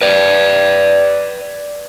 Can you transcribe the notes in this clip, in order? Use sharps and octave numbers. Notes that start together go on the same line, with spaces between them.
B4 D5